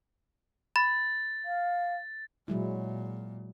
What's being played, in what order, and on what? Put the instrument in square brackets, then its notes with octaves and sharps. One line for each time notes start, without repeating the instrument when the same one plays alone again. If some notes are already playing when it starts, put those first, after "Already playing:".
[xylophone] B5 [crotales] A6
[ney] F5
[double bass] A#2 [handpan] F#3 G#3 E4